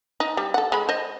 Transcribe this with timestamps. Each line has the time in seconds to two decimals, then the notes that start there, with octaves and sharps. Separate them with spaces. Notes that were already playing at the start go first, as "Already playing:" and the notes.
0.20 D#4
0.37 G3
0.54 A4 F#5
0.72 G#3 B5
0.89 C5 D#5